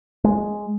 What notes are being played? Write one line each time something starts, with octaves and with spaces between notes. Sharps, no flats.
G#3